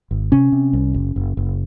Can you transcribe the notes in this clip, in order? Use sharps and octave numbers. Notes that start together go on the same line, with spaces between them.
G#1
C3 C#4
C3
C2
F#1
F#1
F#1